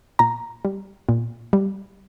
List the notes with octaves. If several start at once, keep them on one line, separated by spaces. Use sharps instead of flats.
A#2 A#5
G3
A#2
G3